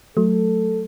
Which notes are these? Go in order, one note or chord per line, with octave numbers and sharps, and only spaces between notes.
F#3 A3 A4